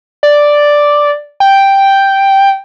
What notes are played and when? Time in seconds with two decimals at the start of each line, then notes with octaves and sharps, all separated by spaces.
0.23 D5
1.40 G5